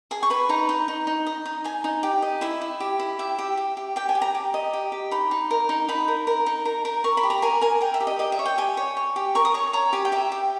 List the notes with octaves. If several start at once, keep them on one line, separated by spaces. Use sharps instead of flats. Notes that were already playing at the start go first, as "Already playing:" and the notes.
G#4 G#5
C#6
B4 B5
D#4 A#5
D#4
D#4
D#4
D#5
D#4
D#4 G#5
D#4
G4
D#5
E4 E5
E4
G4
E4
G4 E5
G4
G4
G4
G4 G5
G#5
G4
A#5
G4
D#5
G4
G4
D#4 B5
D#4
A#4
D#4
D#4 B5
A#4
A#4
D#4
A#4
A#4
A#4 C#6
B5
G4
A#5
A#4 G#5
A#4 G#5
A#4 G5
E5
G4
D#5
G4 D#5
E5
C#5
G5
G4 G#5
C#5
C#5
G4
A#4 C#6
D#6
C#5 C#6
C#5 A#5
G4 G#5
G5
G4 E5
G4